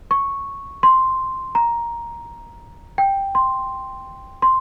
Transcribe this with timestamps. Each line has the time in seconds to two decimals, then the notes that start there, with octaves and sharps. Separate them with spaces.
0.11 C#6
0.83 C6
1.55 A#5
2.98 G5
3.35 C6
4.42 C6